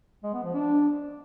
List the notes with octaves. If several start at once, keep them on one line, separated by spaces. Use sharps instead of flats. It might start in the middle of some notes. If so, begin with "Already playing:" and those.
G#3
B3
F3
D4